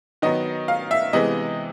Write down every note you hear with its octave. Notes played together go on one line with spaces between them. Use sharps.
D#3 F#3 B3 D#5
F5
E5
C3 E3 G#3 B3 D#5